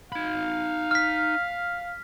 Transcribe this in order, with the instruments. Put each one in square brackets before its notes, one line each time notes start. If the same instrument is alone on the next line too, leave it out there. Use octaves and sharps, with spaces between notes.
[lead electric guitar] D#4 B5 [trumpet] F5
[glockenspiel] F6 B6